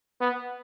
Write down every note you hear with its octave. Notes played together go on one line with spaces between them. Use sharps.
B3